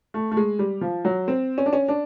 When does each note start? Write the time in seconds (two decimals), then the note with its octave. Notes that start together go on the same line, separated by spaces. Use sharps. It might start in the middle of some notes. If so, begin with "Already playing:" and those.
0.14 A3
0.32 A3
0.37 G#3
0.59 G3
0.81 F3
1.05 F#3
1.28 C4
1.58 C#4
1.66 D4
1.73 C#4
1.88 D4